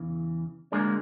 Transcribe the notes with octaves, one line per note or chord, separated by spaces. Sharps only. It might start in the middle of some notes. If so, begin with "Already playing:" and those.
Already playing: E2 C#3 E3
D2 D3 G#3 A#3